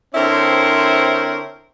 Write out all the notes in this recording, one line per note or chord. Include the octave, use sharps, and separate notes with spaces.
D3 C4 E4 A#4 C5 C#5